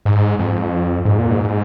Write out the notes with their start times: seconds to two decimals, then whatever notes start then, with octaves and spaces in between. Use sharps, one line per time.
0.05 G#2
0.39 F2
1.05 G#2
1.18 A#2
1.30 G#2